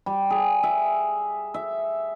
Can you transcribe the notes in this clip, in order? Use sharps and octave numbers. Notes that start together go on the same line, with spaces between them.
G3
G#4
E5
E5